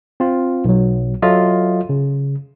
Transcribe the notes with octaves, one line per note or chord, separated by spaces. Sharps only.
C4 F4
B1 F#3
F#3 F4 A4 D#5 E5
C#3